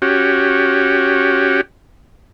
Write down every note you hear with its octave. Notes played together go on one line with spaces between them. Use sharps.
C#4 F#4 G4